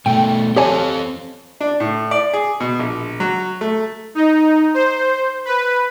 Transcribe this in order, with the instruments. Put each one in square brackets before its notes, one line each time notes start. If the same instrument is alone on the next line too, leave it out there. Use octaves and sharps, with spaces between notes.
[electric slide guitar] B2 A3 [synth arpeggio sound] G5
[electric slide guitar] C4 A4 [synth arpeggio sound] G4 C#5 G#5
[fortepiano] D4
A2
D5
G#4
B2
A#1
F#3
A3
[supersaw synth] D#4
C5
B4